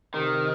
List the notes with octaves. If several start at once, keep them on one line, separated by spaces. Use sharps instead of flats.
C3 D#3